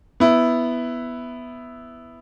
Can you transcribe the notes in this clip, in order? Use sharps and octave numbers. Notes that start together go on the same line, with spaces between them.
B3 E4